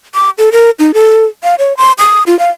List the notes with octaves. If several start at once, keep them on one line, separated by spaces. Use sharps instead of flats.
D6
A4
A#4
D#4
A4
F5
C#5
C6
D#6
F4
F5